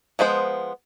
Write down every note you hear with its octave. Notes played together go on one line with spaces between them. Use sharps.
F3 G#3 B3 C5